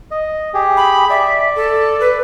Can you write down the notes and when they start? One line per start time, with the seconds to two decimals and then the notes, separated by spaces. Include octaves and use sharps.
0.11 D#5
0.54 G4 G#4
0.77 B5
1.10 D5 E5
1.56 A4
2.00 B4